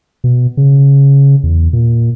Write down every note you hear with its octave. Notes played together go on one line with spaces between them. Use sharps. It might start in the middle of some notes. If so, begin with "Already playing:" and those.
B2
C#3
E2
A#2